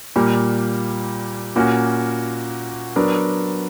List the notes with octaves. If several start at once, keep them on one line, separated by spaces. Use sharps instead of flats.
A#2 G3 A#3
A#2 A#3 C#4 F#4
F#3 B3 D4 A#4